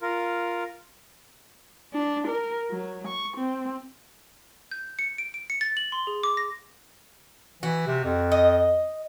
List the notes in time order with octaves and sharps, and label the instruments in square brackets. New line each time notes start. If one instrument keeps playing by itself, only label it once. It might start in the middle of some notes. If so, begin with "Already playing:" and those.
[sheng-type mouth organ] F4 A#4
[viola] D4
A#4
F#3
C#6
C4
[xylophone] G6
C#7
D7
D7
C#7
A6
F#7
C6
G#4
D6
A#6
[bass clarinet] E3 [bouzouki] F#4
[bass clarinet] C3
F2
[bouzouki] D#5